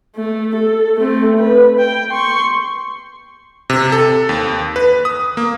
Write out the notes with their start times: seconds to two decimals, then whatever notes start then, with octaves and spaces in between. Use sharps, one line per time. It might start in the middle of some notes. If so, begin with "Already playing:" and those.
0.16 A3
0.55 A4
0.97 A3 C4
1.38 B4
1.80 G5
2.10 C6 C#6
3.70 C3
3.92 A4
4.29 D#2
4.76 B4
5.05 D#6
5.37 A#3